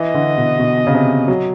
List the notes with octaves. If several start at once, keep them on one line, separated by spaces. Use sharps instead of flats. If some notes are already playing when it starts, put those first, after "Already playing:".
Already playing: E3 D#5
D3
B2
B2
C#3
C3
F#3